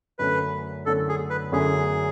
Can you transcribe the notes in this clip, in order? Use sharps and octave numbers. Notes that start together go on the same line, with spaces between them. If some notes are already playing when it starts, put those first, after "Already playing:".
F#2 D3 A3 C#4 B4
F#2 D3 A3 C#4 A4
G#4
B4
F#2 D3 A3 C#4 G#4